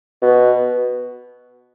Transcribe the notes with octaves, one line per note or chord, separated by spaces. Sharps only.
B2